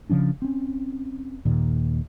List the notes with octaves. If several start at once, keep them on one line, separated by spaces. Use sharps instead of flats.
C#3 F3 C#4 D4
C4 C#4
D#2 A#2 D#3